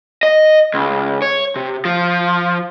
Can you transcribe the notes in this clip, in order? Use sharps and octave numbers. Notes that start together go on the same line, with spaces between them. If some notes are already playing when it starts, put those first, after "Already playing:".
D#5
C#2
C#5
C3
F3